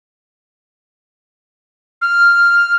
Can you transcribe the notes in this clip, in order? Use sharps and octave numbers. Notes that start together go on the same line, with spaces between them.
F6